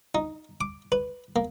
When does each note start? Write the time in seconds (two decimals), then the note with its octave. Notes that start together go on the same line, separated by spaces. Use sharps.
0.15 D#4
0.61 D6
0.92 B4
1.36 A#3